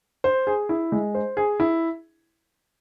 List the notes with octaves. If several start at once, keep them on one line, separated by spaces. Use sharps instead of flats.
C5
G#4
E4
G#3
C5
G#4
E4